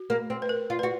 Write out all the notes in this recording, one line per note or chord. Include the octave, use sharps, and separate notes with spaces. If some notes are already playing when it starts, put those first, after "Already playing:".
Already playing: F#4
A#3
C4
B4
A#4
F4
F#4 B4